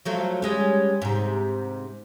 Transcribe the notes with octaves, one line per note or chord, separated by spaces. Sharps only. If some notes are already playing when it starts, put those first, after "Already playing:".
F3 F#3 A3
G3 G#3 C#4
G#2 C3